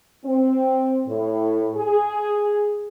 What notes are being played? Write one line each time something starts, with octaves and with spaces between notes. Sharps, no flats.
C4
A2
G#4